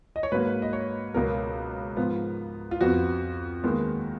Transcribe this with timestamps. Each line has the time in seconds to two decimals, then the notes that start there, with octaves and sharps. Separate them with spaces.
0.16 D#5
0.23 C#5
0.32 G#2 F#3 A#3 B4
0.62 D#5
0.73 C#5
1.14 C#2 B2 F#3 B3 A#4
1.97 G#2 F3 B3
2.71 F4
2.81 F2 F3 B3 F#4
3.64 D#2 D#3 G#3 B3